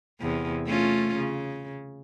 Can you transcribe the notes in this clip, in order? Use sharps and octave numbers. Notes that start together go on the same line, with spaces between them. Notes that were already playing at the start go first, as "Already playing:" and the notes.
E2 C3
A3 C#4 F4
C#3